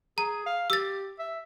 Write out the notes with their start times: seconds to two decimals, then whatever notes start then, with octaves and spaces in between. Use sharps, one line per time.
0.18 G#4 A#5
0.46 F5
0.70 G4 E6 A6
1.19 E5